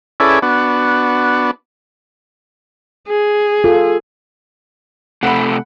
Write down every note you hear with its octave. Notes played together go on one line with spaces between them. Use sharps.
C#4 E4 G#4 A4 B4 D5
B3 D4 F#4
G#4
F4 A4
C3 A3 F#5 B5